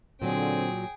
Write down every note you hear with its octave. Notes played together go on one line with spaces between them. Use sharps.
A#2 D3 F#3 C4 G#4 G5